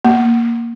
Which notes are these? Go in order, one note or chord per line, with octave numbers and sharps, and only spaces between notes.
A#3